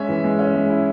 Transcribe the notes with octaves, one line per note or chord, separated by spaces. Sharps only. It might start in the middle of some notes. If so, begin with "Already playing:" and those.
Already playing: G#3 C#4 E5
E3
G#3
C#4
G#3
E4